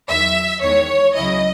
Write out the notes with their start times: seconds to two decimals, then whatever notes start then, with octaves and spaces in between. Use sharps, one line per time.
0.08 E2 D#3 F#3 E5
0.61 E2 D#3 G#3 C#5
1.15 C#2 C#3 F#3 C#4 E4 D#5